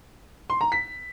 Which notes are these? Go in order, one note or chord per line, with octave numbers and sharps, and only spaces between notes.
C6
A#5
B6